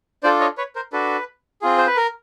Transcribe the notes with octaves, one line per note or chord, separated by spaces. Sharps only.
D4 F4 A4 C5 D5
C#5 D#5
B4 C#5
A#4 C5
D4 F#4 A4 B4
C4 F4 G#4
C5
B4
A#4